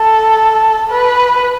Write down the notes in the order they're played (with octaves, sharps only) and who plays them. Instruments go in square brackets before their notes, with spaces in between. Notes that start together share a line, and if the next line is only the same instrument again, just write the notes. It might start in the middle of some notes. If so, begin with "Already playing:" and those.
Already playing: [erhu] A4
B4